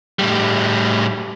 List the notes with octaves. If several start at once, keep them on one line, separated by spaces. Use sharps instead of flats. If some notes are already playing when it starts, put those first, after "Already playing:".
A2 G3